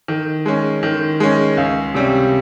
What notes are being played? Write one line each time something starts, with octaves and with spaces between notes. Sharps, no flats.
D#3
G#3 C#4
D#3
G#3 C#4
C#2
C3 G3 C#4